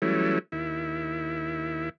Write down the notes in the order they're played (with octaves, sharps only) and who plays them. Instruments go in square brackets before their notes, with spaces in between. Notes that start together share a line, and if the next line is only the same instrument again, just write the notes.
[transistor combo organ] E3 F#3 G3 A3 C#4 E4
D#2 E4